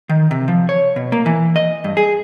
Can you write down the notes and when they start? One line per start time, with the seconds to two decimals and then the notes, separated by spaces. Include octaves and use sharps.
0.09 D#3
0.31 C3
0.48 F3
0.69 C#5
0.96 B2
1.12 A#3
1.26 E3
1.56 D#5
1.84 G2
1.97 G#4